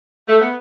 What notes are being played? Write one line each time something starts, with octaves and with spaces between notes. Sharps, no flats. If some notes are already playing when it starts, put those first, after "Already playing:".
A3
B3